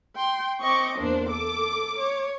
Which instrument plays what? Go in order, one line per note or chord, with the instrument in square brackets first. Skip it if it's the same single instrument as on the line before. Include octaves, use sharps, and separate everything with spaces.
[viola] G5 C6
[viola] C4 D#5 [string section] C#6 D6
[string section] E2 A#3 C5 [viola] D4
[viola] A4 [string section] D6
[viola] C#5